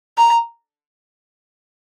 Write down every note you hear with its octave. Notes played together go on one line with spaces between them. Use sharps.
A#5